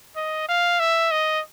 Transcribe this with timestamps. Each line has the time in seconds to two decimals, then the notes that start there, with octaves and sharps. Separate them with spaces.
0.16 D#5
0.49 F5
0.80 E5
1.12 D#5